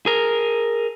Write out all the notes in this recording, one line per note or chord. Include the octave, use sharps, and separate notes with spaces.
G#4 A#4